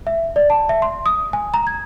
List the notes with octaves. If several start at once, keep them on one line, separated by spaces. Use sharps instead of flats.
E5
D5
A5
E5
C6
D#6
G#5
A#5
G#6